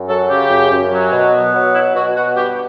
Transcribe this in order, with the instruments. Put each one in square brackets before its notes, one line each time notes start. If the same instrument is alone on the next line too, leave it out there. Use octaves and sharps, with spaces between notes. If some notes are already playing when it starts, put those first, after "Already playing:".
Already playing: [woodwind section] F#2
F#3 A4
C#3 G4
F#2
F#2
F#3
B2
B3
F#3
B2 E4
B2 F#4
B3 F#4
G2 G4